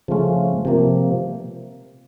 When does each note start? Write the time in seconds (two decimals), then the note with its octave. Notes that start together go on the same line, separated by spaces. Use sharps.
0.08 C#3 F3 A3 C#4 F4
0.65 C3 F3 A#3